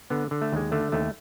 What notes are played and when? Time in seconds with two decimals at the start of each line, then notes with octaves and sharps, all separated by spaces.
0.10 D3 B3
0.31 D3
0.41 A3
0.52 D#2 G#3
0.72 D3 A3
0.92 D#2 A3